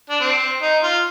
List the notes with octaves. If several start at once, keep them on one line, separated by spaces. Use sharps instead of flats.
D4
C4
D#4
F4